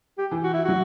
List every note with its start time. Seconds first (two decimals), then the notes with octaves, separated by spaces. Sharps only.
0.18 G4
0.31 E3
0.43 F#4
0.54 E4
0.64 F#3 F#4